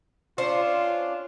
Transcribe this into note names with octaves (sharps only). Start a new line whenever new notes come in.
C#4 D4 F4 C5